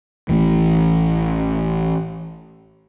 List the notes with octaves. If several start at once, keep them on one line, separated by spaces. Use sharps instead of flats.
A1 A2 E3